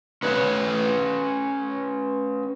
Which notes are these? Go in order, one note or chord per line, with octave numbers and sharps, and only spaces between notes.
C#4 B4 C#5